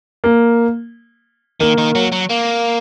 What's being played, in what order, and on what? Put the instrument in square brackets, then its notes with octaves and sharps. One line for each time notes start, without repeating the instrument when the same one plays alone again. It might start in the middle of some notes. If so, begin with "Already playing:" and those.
[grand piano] A#3
[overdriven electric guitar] D#3 [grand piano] A#3
[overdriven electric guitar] D#3
F#3
F#3
A#3